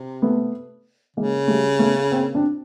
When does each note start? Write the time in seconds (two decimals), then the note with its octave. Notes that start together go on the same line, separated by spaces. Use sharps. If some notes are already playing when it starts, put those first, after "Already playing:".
Already playing: C3
0.22 A3 B3
1.17 C#3 G#3 A#3
1.48 G3 A3
1.79 A3 B3
2.11 A#3 C4
2.35 C4 D4